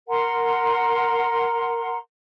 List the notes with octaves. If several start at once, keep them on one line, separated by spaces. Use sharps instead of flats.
A#4 F#5 A#5 C6